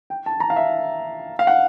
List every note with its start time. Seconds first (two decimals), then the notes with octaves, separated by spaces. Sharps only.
0.10 G5
0.26 A5
0.40 A#5
0.50 F5
0.56 E5
1.39 F5
1.47 F#5